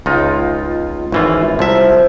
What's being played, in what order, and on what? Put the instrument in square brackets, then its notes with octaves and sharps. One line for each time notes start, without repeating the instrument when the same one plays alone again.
[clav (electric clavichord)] C#2 D#4 [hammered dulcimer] F4
[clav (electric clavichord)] G#1 E3 F4 [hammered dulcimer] F#2
[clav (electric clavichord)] C2 E5 [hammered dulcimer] F3